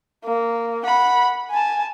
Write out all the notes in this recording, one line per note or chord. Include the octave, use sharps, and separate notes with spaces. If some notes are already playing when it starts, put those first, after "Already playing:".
A#3
F#5 B5
G#5 A5